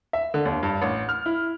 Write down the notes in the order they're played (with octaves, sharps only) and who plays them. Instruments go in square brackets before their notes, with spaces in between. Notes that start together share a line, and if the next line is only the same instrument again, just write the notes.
[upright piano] E5
D3
D#2
G2
A1
F6
E4